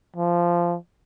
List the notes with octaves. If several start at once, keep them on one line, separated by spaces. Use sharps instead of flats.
F3